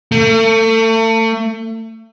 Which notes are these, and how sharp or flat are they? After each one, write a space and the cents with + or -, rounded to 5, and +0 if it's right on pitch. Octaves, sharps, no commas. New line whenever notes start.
A3 +35